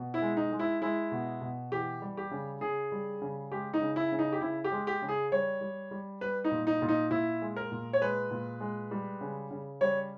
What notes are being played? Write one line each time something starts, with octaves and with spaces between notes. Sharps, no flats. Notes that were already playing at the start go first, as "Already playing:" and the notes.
Already playing: B2
E4
G#3
D#4
G#3
E4
G#3 E4
B2
B2
E3 G4
G3
G4
C#3
C#3 G#4
G3
C#3
G#3 G4
D#4
C#3
E4
C#3
D#4
G4
C#3 E4
G4
G#3
G4
C#3
G#4
G3 C#5
G3
G3
G3 B4
D#4
A#2
D#4
A#2
D#4
A#2 E4
G#3
A#4
A#2
C#5
G#3 B4
A#2
G#3
G3
C#3
C#3
G3 C#5